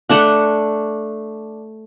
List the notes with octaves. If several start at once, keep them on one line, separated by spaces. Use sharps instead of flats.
A3 D4 F#5